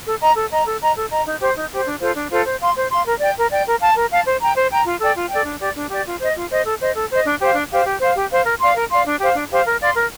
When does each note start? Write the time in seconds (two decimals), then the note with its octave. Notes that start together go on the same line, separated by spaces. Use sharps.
0.06 A4
0.21 D#5 A#5
0.36 A4
0.52 D#5 A#5
0.66 A4
0.81 D#5 A#5
0.96 A4
1.11 D#5 A#5
1.26 D#4
1.40 G4 C5
1.56 D#4
1.71 G4 C5
1.86 D4
2.00 F4 A4 C5
2.16 D4
2.31 F4 A4 C5
2.45 C5
2.60 F5 C6
2.76 C5
2.91 F5 C6
3.06 A#4
3.20 D5 G5
3.36 A#4
3.51 D5 G5
3.66 A#4
3.80 F5 A5
3.95 A#4
4.10 F5 A5
4.26 C5
4.41 G5 A#5
4.56 C5
4.70 G5 A#5
4.85 F4
5.00 A4 D5 G5
5.15 F4
5.30 A4 D5 G5
5.46 D4
5.60 G4 D5
5.76 D4
5.90 G4 D5
6.06 F4
6.20 C5 D#5
6.36 F4
6.50 C5 D#5
6.65 A4
6.81 C5 D#5
6.95 A4
7.10 C5 D#5
7.26 D4
7.40 G4 C5 F5
7.55 D4
7.71 G4 C5 F5
7.86 G4
8.00 C5 F5
8.15 G4
8.31 C5 F5
8.45 A#4
8.59 D5 F5 C6
8.74 A#4
8.90 D5 F5 C6
9.05 D4
9.20 G4 C5 F5
9.35 D4
9.50 G4 C5 F5
9.66 A#4
9.80 D5 F5 C6
9.95 A#4